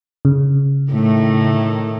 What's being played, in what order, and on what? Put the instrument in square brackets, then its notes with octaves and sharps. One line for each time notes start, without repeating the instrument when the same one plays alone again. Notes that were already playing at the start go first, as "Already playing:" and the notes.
[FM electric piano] C#3
[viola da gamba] A2 D#3 A3